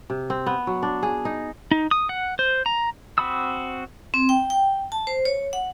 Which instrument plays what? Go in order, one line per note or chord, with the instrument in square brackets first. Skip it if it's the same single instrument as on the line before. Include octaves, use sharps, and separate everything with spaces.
[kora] C3
C4
B3
F#3
D4
G#4
D#4
[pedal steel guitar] D#4
D#6
F#5
C5
A#5
C4 F#4 B5 D#6 E6
[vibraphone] C4
G5
G5
A5
C5
C#5
F#5